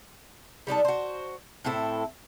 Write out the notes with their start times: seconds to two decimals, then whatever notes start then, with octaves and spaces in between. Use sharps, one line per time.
0.67 G3 D4 D#4 A4
0.85 F#4 C5
1.65 A2 C4 E4 A4